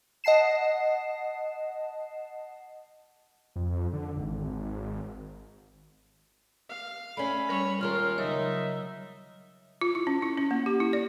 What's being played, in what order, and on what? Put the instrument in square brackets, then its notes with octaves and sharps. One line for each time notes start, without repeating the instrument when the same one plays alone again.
[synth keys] D#5 F#5 A5 C7 E7
[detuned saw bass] F2
D3
G#1
[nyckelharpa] F5
[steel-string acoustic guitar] A3 C#4 [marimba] D5 G#5 [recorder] B5
[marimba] G3 [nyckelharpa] C#5
[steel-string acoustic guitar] D#2 G#3 A#4 [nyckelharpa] F4 [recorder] F6
[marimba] C#3 F#3 C#5 [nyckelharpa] D#4 [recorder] E5
[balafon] F4
E4
C#4
E4
C#4
A#3
G4
E4
D5